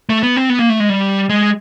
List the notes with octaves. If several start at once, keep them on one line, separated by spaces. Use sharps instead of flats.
A3
B3
C4
B3
A#3
A3
G#3
G3
G#3